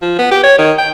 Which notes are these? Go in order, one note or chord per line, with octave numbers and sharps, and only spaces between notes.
F3
B3
G4
C#5
D#3
G5